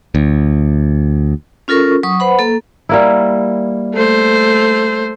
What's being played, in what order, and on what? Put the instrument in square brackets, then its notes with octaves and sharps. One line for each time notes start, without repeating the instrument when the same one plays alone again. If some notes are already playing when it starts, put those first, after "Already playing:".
[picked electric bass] D2
[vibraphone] C#4 F4 A4 A#4 C#6
F#3 C#6 D#6
B4 C5 F#5 B5
A#3 A4
[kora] G3 A#3 E4
[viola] A3 C5